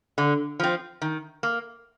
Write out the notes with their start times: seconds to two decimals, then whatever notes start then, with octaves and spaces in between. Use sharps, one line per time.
0.18 D3
0.60 F3 C4
1.02 D#3
1.43 A#3